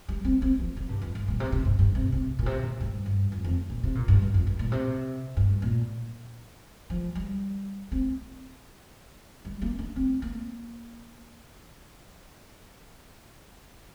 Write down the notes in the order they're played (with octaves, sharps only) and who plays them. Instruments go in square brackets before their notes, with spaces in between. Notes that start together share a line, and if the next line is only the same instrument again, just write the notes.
[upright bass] G3
C4
C4
F3
C3
G2
F2
G2
A#2
C3
C3
G2
G2
C3
C3
A#2
C3
A#2
G2
G2
F2
F2
A#2
C3
A#2
G2
G2
F2
G2
A#2
C3
G2
A#2
F3
G3
C4
G3
A#3
D4
C4
A#3